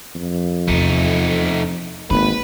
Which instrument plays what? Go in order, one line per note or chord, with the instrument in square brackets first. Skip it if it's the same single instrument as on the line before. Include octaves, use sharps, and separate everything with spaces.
[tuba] F2
[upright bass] E2 C3 [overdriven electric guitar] A3 D#4
[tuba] G#1 [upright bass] A#3 D#4 [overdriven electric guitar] B4